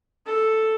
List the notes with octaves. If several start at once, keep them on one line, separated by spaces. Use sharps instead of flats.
A4